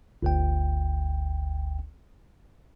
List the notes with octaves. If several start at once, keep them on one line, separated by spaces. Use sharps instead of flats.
G1 D2 G5